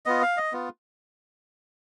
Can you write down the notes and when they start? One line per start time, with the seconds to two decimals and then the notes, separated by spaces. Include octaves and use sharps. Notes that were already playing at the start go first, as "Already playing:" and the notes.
0.06 B3 F4 D#5
0.22 F5
0.37 D#5
0.53 B3 F4